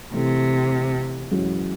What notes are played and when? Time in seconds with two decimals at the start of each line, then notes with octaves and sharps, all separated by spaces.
0.13 C3 E3 A3 C4
1.31 F#2 E3 G#3 C#4 F#4